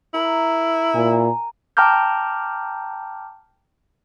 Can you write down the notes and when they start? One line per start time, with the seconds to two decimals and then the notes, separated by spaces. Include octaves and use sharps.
0.14 E4 A#4 E5
0.94 A#2 G#5 A#5
1.77 G5 A5 A#5 D6 F6 G6